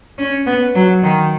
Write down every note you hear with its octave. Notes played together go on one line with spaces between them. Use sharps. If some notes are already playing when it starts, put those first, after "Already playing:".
C#4
B3
F#3
D#3